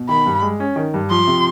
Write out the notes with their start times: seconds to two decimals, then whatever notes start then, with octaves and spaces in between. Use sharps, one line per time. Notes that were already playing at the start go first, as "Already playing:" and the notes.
Already playing: B2
0.09 D#3 B5
0.26 G2
0.42 G#3
0.60 C#4
0.76 D#3
0.94 G2
1.10 F3 C6
1.27 C3